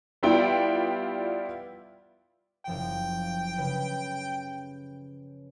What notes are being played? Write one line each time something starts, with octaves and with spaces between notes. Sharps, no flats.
G3 B3 E4 F4 G5
F#1 F3 G5 D7
C#3 G4 B4